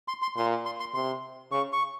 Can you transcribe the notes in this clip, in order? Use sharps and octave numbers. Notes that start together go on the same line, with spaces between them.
C6
C6
A#2 C6
C6
C6
C3 C6
C#3 C#6
C#6